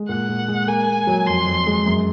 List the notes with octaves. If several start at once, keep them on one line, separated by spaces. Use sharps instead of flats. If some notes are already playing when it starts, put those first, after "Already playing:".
Already playing: G#3
A#2 F#5
A#2
G#3
A#3 G#5
A#3
F#3
F2 C6
F2
G#3
F#2